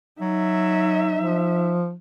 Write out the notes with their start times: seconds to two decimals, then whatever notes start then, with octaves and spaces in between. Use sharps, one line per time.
0.21 F#3 D#4 E5
1.16 F3